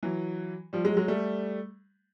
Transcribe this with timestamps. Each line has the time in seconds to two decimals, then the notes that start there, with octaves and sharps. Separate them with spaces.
0.03 E3 F#3
0.73 F3 G3
0.85 F#3 G#3
0.97 F#3 G#3
1.08 G3 A3